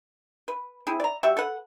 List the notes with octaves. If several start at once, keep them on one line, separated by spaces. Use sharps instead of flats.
B4
C4 E4 G#4
D5 A#5
G3 F#4 E5
A4 B4 F#5